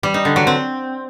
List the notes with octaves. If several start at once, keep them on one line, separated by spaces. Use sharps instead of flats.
G3
D#4
D3
F#3
C4